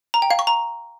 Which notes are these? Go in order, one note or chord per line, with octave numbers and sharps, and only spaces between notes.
A#5
G5
F5
C#6
A#5